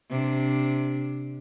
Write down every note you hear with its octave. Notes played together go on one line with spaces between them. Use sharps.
C3 D4